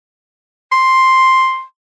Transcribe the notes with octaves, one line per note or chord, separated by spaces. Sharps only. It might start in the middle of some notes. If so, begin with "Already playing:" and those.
C6